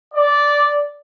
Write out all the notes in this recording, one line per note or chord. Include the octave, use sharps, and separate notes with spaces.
D5